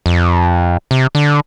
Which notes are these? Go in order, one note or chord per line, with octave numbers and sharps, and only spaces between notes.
F2
C3
D3